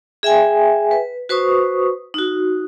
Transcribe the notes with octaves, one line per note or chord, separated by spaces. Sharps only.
G#4 E5 G5 G#5
B4
F#4 B4 C5 C#6 D#6
D#4 F#4